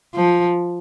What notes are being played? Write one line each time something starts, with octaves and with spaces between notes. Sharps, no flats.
F3